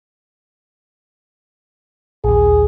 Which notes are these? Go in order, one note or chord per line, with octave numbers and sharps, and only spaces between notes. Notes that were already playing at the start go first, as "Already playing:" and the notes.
A#1 D#2 G#4